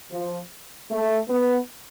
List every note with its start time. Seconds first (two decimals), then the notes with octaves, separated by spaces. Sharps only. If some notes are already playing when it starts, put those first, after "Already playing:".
0.11 F3
0.90 A3
1.29 B3